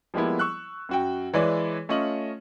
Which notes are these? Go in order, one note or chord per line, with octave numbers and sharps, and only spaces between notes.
F3 G3 G#3 A#3 B3 E4
C#6 E6 F#6
F#2 F#4 G5
E3 G#3 E4 B4 C#5 D5
A3 C#4 F4 D#5 C#6 F#7